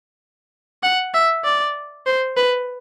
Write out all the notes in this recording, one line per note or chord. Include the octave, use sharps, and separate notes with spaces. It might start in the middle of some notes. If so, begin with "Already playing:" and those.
F#5
E5
D5
C5
B4